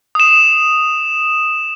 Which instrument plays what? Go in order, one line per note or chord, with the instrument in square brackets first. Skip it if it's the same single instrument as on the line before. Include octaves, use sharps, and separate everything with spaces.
[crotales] D#6 E7